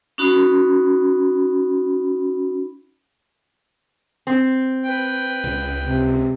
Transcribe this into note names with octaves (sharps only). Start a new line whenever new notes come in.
C#4 D#4 F#4 B5
C4
B4 G5
C#2
C3